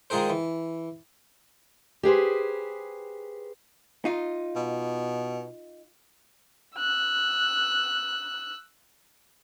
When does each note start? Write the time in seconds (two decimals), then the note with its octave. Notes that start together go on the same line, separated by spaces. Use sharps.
0.10 D#3 G#3 F4 G#4 A#4 C5
0.29 E3
2.03 G4 G#4 B4 C5
4.05 D#4 F4
4.56 B2
6.76 E6 F#6